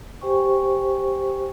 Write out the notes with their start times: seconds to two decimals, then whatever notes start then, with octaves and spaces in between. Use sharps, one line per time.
0.21 G4 C5 G5 G#5 C#6